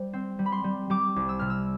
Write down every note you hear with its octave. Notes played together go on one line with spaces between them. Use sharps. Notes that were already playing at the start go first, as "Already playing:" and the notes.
Already playing: G3 C5
C4
G3
B5
C6
G3
G3 D6
C2
E6
C3 F6
E6